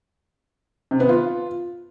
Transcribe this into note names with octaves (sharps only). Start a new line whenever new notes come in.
C3
B3
F4